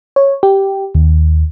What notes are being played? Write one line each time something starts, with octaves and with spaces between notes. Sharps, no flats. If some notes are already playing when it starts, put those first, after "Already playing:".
C#5
G4
D#2